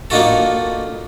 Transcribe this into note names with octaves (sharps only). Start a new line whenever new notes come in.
A#3 D4 D#4 F4 F#4 A4